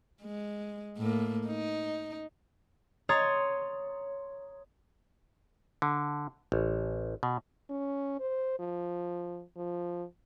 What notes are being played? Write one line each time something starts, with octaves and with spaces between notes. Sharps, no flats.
G#3
A2 A#3
D#4
C#5 A#5 C6 D#6 A6 C7
D3
A1
B2
C#4
C5
F3
F3